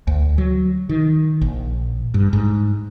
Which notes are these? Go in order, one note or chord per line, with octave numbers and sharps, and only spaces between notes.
D2
F#3
D#3
A#1
G2
G#2